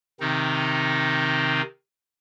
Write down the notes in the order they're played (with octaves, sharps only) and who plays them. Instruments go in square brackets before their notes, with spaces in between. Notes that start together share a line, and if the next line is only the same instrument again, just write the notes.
[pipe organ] C3 D#3 C4 D#4